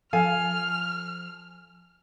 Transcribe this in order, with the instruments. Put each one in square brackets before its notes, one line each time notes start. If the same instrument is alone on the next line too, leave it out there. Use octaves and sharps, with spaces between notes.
[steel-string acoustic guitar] F3 [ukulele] A4 F5 G#5 [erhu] F6